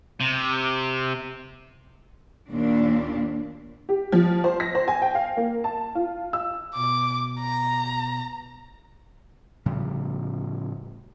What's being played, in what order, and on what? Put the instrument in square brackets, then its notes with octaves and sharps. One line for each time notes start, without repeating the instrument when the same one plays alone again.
[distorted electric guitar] C3
[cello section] D#2 A#2 D4
[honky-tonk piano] G4
F3
C5
A#6
C5
G#5
G5
F5
A#3
A5
F4
E6
[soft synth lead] B2 [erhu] D6
[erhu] A#5
[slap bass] A2 C#3 F3 G3